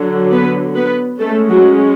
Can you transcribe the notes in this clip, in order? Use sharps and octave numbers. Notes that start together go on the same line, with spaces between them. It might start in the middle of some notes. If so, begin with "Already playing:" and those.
Already playing: D3 F#3
B3 B4
B3 B4
G#3 A3 C#4 A4
F#3 F#4